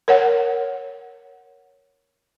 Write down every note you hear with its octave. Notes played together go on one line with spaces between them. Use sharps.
A#4 C#5 F#5